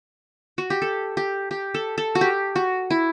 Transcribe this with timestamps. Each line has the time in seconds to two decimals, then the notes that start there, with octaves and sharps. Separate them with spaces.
0.58 F#4
0.70 G4
0.82 A4
1.17 G4
1.51 G4
1.74 A4
1.98 A4
2.15 F#4
2.21 G4
2.56 F#4
2.90 E4